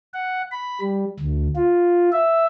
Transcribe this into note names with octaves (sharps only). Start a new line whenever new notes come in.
F#5
B5
G3
D2
F4
E5